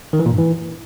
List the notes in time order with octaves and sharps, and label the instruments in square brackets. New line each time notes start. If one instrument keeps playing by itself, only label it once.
[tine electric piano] D#3
E3
A#2
G2
E3